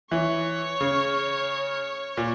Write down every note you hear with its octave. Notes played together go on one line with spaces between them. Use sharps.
E3 C#5
C#3
A#2